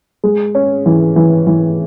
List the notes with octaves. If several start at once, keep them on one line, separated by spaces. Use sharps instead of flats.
G#3
C#4
E3
E3
E3